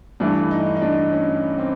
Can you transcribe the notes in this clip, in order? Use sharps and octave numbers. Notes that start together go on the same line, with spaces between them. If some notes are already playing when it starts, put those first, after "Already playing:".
G2 E3 A3 D4
D#4
D#4
D4
C#4
C4